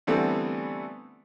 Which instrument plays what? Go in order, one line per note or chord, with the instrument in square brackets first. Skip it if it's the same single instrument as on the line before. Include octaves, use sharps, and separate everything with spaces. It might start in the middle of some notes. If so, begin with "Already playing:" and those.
[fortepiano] D3 E3 G3 A3 B3 C4